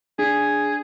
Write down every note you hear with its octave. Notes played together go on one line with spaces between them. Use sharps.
D4 G#4